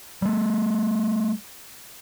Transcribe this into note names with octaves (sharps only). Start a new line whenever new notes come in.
G3 A3